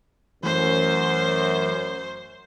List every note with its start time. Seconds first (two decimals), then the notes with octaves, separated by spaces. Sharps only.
0.44 F#2 E3 A3 C5